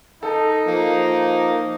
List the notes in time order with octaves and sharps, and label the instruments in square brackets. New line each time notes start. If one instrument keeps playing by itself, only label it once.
[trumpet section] D#4 [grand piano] A4
[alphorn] F3 [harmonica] A#3